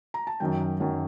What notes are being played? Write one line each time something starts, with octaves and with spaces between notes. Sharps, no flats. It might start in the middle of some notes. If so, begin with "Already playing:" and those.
A#5
A5
F#2 D#3 F#3 G5
F#2 D#3 F#3